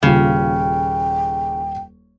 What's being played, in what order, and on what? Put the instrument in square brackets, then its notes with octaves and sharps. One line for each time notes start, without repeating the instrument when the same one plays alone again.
[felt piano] D#1 F4 [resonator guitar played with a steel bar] C#3 [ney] G5